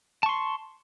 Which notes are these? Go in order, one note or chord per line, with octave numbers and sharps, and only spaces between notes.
A5 C6 C#6